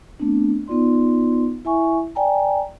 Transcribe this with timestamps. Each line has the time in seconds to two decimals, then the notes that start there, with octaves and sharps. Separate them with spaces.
0.20 A3 B3 C4 D4
0.68 B3 D#4 F4 D5 C6
1.65 E4 E5 G#5 C#6
2.15 D5 G5 G#5 A#5